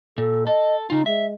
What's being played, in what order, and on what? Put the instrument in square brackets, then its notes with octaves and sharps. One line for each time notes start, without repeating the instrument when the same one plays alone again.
[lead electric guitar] A#2 [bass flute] A4
[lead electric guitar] A4 [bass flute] D#5
[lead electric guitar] C#3 F4 [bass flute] D#4
[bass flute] G#3 [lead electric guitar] E5